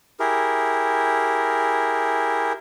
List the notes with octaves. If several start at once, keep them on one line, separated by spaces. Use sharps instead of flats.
E4 G4 G#4 A#4